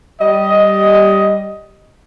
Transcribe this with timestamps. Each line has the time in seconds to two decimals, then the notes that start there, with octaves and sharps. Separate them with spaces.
0.21 G3 D#5